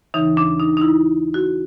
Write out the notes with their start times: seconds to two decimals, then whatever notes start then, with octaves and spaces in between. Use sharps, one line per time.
0.14 D#2 C#3 E3 D#4
0.37 D4
0.60 D#4
0.77 D#4
0.82 E4
1.34 F#4